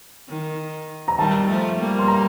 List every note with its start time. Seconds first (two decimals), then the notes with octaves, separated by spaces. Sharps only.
0.29 D#3
1.08 A#5
1.18 D#3 G3 A5
1.48 F3 A3
1.77 G3 A#3
1.99 C6
2.08 A#5